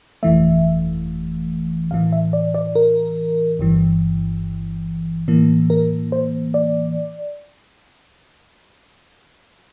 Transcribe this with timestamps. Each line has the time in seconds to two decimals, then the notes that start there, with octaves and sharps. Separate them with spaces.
0.23 G1 F2 E3 A3 E5
1.91 A#1 A2 E3 F5
2.12 E5
2.33 D5
2.54 D5
2.75 A#4
3.59 G1 G2 E3
5.28 A2 E3 A#3
5.70 A#4
6.12 C5
6.54 D5